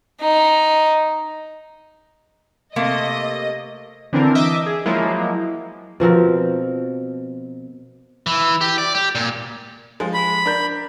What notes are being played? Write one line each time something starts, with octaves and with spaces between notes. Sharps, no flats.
D#4
C3 A3 A#3 D#5
D3 E3 C4 D4 A#4
D#5 E5 D6
G#4
F3 F#3 G#3 A#3 E4
B2 F3 C4 A#4
E3
G4
D5
G4
A#2
F3 G#3
B5
D4 A#4 G6